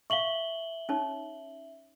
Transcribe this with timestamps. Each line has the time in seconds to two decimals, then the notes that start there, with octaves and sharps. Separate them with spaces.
0.10 E5 F5 C#6 F#7 G7
0.89 C#4 D#4 C#5